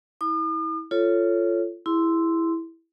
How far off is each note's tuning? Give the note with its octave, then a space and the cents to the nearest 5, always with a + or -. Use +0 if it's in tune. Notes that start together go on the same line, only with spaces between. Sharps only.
E4 -35 D#6 -45
F4 -15 A4 +0 C#5 +0
E4 +0 G#4 -25 C6 -10